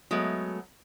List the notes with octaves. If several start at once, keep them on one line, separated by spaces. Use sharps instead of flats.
F#3 G#3 A3 B3